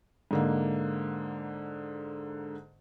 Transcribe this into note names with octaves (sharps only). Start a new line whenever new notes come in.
G#2 D3 A#3